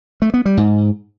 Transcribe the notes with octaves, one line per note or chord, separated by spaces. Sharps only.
A3
B3
G3
G#2